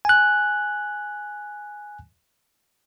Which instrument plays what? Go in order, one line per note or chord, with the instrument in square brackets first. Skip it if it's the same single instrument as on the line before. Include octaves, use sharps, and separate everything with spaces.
[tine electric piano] G#5 F#6